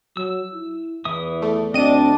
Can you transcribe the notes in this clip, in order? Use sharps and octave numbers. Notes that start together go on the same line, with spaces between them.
F#3 E6
E4
E2 E3 E5 D#6
A3
D2 C4 D4 D#5 D#7